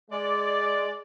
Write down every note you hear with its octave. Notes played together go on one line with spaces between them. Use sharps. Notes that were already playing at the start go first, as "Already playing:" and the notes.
G#3 D5